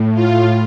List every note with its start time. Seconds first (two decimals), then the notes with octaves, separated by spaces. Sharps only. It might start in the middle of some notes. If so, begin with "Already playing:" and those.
Already playing: A2
0.14 F4